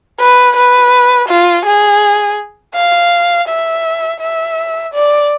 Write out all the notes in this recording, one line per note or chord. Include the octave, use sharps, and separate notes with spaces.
B4
B4
F4
G#4
F5
E5
E5
D5